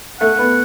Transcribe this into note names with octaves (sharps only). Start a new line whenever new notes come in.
A3 F#5
B3